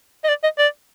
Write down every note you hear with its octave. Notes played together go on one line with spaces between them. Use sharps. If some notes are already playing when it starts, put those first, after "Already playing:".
D#5
D5
D#5
D5